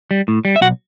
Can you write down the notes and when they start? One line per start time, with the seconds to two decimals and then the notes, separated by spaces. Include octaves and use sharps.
0.11 G3
0.28 A2
0.45 G3
0.56 E5
0.61 B1 F#4 F#5